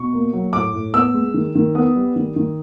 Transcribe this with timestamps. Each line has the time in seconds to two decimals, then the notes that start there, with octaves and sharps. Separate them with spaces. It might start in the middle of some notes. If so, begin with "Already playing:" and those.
Already playing: B2 C#6
0.13 A#3
0.33 F#3
0.53 A2 D6
0.73 A2
0.94 B3 E6
1.14 G#3
1.34 D#3
1.55 D#3
1.75 B3 D#6
1.96 G3
2.16 D#3
2.36 D#3